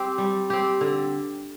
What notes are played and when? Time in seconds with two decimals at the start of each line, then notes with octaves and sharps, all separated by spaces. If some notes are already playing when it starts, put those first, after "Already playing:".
Already playing: C4 G4
0.18 G3
0.50 C4 G4
0.81 D3